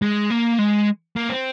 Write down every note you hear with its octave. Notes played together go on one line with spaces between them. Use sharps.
G#3
A#3
G#3
A#3
C4